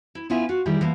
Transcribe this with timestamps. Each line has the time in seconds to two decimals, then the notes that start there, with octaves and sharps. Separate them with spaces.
0.15 E4
0.30 B3 C#4 E4 F4 E5 G#5
0.49 F4 F#4
0.66 D#3 G3 E4 G4 G#4
0.81 E3 F3 A#3 B3